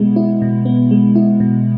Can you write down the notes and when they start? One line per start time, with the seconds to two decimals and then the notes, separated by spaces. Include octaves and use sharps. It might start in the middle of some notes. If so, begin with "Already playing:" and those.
Already playing: B2 G#3 B3 E4
0.16 E4
0.42 B2
0.66 B3
0.91 G#3
1.16 E4
1.40 B2